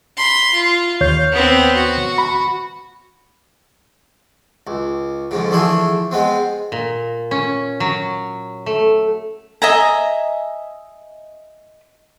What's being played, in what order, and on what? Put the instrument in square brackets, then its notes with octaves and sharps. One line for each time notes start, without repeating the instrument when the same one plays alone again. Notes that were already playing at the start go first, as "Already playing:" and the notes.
[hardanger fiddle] B5 C6
F4
[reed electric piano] D#2 C#5 G6 [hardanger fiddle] F5
[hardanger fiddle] B3 C4
F#4
[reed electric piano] B5
[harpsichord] C#2
F2 G#2 C#3
D3 E3 F3 A3 G#4
G#3 B3 C4
[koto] A#2
C#4
F#3
A3
[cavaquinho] D#5 E5 G#5 A#5